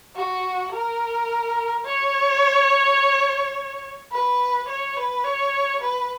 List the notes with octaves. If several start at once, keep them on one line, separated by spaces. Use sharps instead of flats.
F#4
A#4
C#5
B4
C#5
B4
C#5
B4